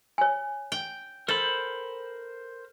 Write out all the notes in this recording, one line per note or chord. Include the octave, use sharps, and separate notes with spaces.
C#5 G#5
G5
A4 A#4 C5 B5